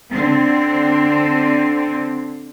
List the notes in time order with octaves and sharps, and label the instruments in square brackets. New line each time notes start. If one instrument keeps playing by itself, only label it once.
[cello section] D3 C4